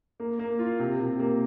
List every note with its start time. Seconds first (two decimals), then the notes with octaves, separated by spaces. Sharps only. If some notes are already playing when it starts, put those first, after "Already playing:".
0.20 A#3
0.39 A#3
0.59 F4
0.80 C3
1.00 C3
1.20 A#3